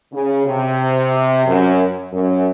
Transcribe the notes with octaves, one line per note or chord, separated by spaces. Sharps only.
C#3
C3
F#2
F#2